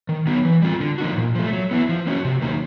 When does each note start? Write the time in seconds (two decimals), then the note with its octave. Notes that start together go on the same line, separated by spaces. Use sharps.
0.09 D#3
0.27 F#3 B3 D#4
0.45 E3
0.62 G3 C4 F4
0.80 D3
0.98 F3 A#3 D#4 F#4
1.17 A#2
1.35 F3 A3
1.53 F#3
1.71 B3 E4
1.89 F3
2.07 A#3 C#4 F#4
2.25 C3
2.42 D#3 F#3 A#3 D#4